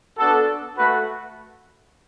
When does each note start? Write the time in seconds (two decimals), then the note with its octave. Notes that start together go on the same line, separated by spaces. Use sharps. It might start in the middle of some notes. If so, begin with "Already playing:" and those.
0.18 B3 D4 F#4 A4
0.77 A3 F#4 B4